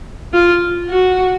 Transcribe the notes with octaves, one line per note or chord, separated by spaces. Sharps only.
F4
F#4